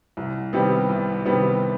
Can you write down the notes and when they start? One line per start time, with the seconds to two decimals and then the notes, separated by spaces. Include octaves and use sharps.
0.17 C2
0.53 C3 D#3 G3 B3
0.89 C2
1.25 C3 D#3 G3 B3